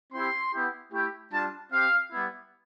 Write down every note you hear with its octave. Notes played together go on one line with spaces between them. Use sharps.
C4 E4 G4 C6
B3 E4 G4
A3 E4 G4
G3 D4 F4 A5
C4 G4 F5
G3 B3 E4